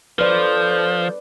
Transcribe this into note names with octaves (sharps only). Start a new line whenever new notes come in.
F3 A4 B4 C5 D5 G6